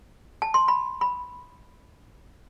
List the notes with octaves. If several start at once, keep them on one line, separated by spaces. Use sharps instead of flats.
A5
C6
B5
B5